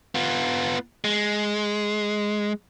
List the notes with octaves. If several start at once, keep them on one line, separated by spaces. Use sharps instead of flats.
B3 F4
G#3